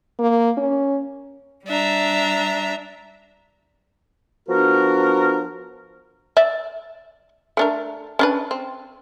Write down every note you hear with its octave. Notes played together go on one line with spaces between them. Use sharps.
A#3
C#4
G3 D4 E5 A#5
F3 B3 D4 F#4 A#4
D5 E5
A3 D4 A#4
C#4 D4 B4
C4